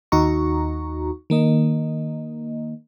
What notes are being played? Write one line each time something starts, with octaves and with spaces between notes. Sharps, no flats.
D#2 D#4 F#4 A#5 C#6
D#3 A#3 D#5